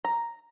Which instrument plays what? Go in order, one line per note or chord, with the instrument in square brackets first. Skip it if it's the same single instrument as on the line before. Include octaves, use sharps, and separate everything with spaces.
[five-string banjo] A#5